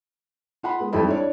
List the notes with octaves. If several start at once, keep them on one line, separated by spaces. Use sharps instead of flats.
F4 F#5 B5 C6
G#3 B3
F2 G3 D#4 E4 A4 B5
D4 E4 C#5 D5